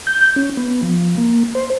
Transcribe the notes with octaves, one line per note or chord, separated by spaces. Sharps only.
G6
C#4
B3
F3
A#3
C5